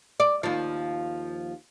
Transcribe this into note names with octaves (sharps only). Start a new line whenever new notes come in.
D5
D#2 F3